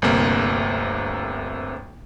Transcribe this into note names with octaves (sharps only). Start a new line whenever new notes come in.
G1 D2 C3 A#3